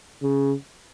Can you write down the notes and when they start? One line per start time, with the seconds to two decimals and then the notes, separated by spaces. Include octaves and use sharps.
0.23 C#3